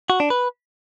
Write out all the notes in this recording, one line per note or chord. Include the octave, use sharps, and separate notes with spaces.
F#4
D4
B4